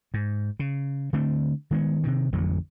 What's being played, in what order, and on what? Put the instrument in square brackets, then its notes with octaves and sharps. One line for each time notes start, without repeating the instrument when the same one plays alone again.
[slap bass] G#2
C#3
D3 A3 C4
D#3 G#3 B3
C3 D#3
A1 F2 D3 F#3